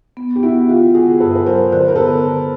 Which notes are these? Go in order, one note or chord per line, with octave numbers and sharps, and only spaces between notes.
B3
G4
B3 E4 F#4
D3 F4 G4
B3 F#4 G#4
G2 A4 B4
B4
F#3 A#4 C5
D3 C5
B4
A#4
B3 A4 B4
D3